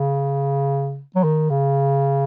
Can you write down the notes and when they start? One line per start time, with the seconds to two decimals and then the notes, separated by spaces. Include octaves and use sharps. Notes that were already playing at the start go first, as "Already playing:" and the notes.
Already playing: C#3
1.16 F#3
1.24 D#3
1.50 C#3